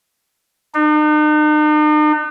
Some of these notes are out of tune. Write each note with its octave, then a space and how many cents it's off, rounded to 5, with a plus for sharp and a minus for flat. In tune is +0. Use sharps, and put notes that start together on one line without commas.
D#4 -45